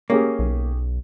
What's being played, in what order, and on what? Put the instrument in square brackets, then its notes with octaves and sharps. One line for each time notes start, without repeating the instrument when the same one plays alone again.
[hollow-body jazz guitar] A#3 [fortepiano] C#4 G4 G#4
[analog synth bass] B1